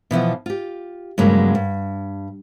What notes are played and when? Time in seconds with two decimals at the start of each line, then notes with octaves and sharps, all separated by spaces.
0.11 B2 E3 F3 B3
0.46 F4 G4
1.18 G2 C#3 F#3 G#3 A#3
1.55 G2